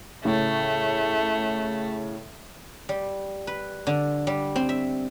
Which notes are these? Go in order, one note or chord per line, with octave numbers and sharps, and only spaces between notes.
A2 C#3 A3
G3
B4
D3
G3
C4
E5